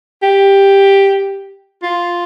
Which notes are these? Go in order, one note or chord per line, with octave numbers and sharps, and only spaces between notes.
G4
F4